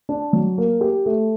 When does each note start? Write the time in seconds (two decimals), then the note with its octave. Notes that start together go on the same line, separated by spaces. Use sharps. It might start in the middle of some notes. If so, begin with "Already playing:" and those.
0.09 D4
0.33 F#3
0.58 A#3
0.81 G4
1.06 A3